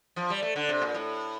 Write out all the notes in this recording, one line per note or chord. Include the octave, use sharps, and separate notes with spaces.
F3
G3
A3
D3
C3
A#2
A2